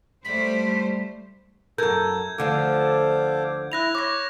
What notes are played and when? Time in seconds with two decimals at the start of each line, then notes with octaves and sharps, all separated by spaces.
0.25 G3 A3 C5 B6
1.78 F#2 A4 A#4 G6 G#6
2.38 D2 D3 F3 A4 F5 D6
3.72 E4 F#6 A#6 F7
3.95 C#5 D6 A#6